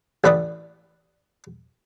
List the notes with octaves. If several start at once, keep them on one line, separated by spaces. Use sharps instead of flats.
A1 A2 B4 D5 D#6